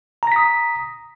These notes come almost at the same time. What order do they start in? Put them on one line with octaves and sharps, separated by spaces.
A#5 A#6 B6 D#6